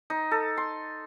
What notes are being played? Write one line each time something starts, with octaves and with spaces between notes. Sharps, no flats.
D#4
A4
C6